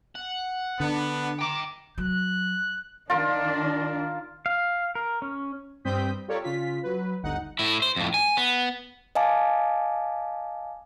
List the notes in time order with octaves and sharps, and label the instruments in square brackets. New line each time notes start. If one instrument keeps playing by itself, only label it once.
[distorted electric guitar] F#5
[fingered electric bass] D3 [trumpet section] B3 D4
[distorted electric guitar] G5 A#5 [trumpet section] D6
[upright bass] F#3 [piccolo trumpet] F#6
[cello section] D#3 D4 [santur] F4 A#4
[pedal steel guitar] F5
A#4
C#4
[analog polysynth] G2 G3 C4 D#6 G6 B6
F4 G4 A4 A#4 C#5 D5
C#3 F4 B6
F#3 B4
G1 D2 D#4 F#5
[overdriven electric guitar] A2 E4
C5
F2 A2
G#5
B3
[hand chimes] D#5 F5 G#5 A5 D6